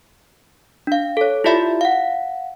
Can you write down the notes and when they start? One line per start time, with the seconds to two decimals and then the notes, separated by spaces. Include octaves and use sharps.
0.87 D4 F5
1.17 A4 C#5
1.44 E4 F4 G4 D5 E5 B5
1.81 F5 F#5